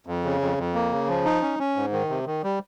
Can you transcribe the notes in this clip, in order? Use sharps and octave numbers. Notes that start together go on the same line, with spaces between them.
F2
C#3
F2
F2
A#3
C#3
F3
D#4
C#4
C#4
G#2
D#3
C3
D#3
G3